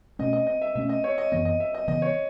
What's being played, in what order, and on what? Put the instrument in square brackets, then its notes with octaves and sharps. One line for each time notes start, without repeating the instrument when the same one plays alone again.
[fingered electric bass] B2 A3 C#4 [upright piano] D#5
[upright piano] D#5
D#5
E5
[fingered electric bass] B2 A3 C#4 [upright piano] E5
[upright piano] D#5
C#5
D#5
[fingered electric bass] F#2 E3 B3 [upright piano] D#5
[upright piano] D#5
E5
D#5
[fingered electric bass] C#3 E3 B3 [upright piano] D#5
[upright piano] C#5